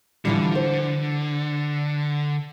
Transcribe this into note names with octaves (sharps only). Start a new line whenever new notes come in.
D3 E3 F3 G3
C5